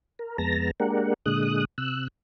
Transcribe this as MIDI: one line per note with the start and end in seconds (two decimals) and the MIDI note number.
0.19 0.37 70
0.38 0.71 41
0.38 0.71 56
0.38 0.71 59
0.38 0.71 81
0.38 0.71 82
0.38 0.71 94
0.80 1.14 56
0.80 1.14 58
0.80 1.14 62
0.80 1.14 67
0.80 1.14 70
0.80 1.14 78
1.26 1.65 46
1.26 1.65 50
1.26 1.65 56
1.26 1.65 87
1.26 1.65 90
1.78 2.08 48
1.78 2.08 88
1.78 2.08 90